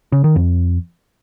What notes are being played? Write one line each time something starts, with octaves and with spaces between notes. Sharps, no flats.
C#3
D#3
F2